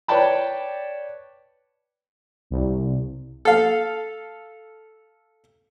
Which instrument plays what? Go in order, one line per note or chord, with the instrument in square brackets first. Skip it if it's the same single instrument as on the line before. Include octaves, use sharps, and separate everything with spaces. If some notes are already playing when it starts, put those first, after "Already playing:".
[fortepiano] B4 C#5 D5 G5 A5 B5
[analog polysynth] C2
[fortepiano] A4 F5